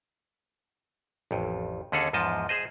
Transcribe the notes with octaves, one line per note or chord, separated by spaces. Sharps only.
A1 F2
D#2 D3 C#4 G#4 A4 F#5
E2 G#2 F3 D#5 A5
G#4 C5 D#5